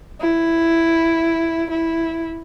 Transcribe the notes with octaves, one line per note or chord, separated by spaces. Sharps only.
E4
E4